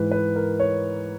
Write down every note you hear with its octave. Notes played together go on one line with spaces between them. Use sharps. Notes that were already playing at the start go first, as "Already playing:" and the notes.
Already playing: G#2 E3 B4
B4
A#4
C#5